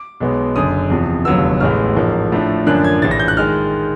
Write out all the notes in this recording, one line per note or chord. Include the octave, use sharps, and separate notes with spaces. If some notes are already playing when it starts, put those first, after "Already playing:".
Already playing: D6
B1 B2 G#3 B3
F#1 F#2 D3 D#6
E2 C3 F3
F1 D#2 D3 F#3 B3 E6
A1 A2 E3 G#3 B3 F6
A1 G#2 F3 A#3
A2 F3 A3 D4
F#2 D3 F3 A#3 D4 F#6
G#6
A#1 A2 E3 A6
A#6
G6
F#6
D#3 G#3 F6